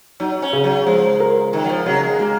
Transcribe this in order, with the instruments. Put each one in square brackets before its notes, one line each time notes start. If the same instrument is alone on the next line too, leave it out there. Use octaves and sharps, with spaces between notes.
[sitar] F#3 [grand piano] D#4
[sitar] C#4
[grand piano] C#3
[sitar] F#3
[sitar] F3 [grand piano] G#3
[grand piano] A#4
[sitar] D#3 [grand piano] D#4
[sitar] F#3
F3
[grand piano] C#3 [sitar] F#3
[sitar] G#3
[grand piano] G#3 [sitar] A#3